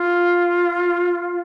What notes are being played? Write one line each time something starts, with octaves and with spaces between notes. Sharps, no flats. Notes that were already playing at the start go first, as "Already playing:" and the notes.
Already playing: F4